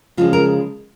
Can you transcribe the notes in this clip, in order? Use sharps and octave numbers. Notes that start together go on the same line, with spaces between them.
C#3 F3 G#3 F4
A#4